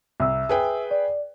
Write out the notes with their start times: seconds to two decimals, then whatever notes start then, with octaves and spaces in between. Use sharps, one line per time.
0.20 C2 E5 E6
0.49 G#4 B4 G5
0.91 D5